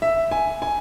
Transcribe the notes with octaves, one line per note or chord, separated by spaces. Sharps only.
E5
G#5
G#5